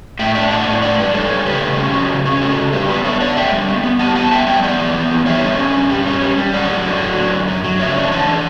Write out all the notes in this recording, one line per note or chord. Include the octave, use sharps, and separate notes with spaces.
A2 E5 G5
D4 E5 G5
A2 D5 F#5
A2
D4 D5 F#5
G3 B4 D5
G3 A4 C#5
G3
C#3 G4 B4
C#3
C#4
F#3
C#3
C#4
C#3 F#4 A4
C#3
G3 G4 B4
B3 B4 D5
D4 C#5 E5
D4 D5 F#5
D3 E5 G5
G3
B3
B3
G3 F#5 A5
B3 F#5 A5
B3 E5 G5
G3 E5 G5
B3 D5 F#5
E3
B3
E3
G3 C#5 E5
D3
C#4
G2
G3
C#4
G3
G3
F#2 D5 F#5
F#3
D3
F#3
D3
F#2
F#3
F#3
C#3 C#5 E5
D4
E3 F#5 A5
D4